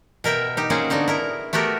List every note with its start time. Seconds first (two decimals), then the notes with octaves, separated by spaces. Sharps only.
0.24 B2 A#4 E5 G5
0.57 D#4 G4
0.70 A#3 C4 C#4 F#4 G#4
0.90 D3 B3 D#4 F#4
1.08 E4 A#4 A#5
1.53 A3 B3 F#4 G4 A#4